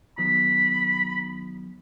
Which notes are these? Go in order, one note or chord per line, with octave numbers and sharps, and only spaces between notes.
D#3 F#3 B3 B5